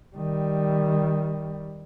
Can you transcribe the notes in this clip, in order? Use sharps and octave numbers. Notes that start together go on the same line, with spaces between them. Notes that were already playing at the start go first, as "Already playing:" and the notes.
D#3 G3